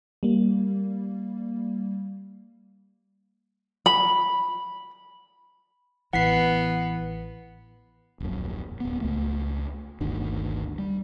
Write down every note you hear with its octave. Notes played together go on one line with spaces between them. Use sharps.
G3 A#3
B5
A1 E3 B3 F#5 B6 C7
D#1 A#1 F#2
D1 B3
C#2 A3
G1 D2 D3 D#3
G3